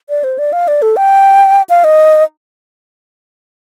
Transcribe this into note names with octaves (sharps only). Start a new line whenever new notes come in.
D5
C5
D5
F5
D5
A4
G5
F5
D#5